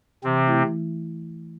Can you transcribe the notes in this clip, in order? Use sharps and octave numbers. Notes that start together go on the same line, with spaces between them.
C3 E3 C4
A3 E4
E3